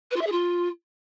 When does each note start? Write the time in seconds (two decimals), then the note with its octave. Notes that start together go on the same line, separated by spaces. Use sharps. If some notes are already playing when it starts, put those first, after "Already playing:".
0.11 B4
0.16 F4
0.21 E5
0.26 G#4
0.32 F4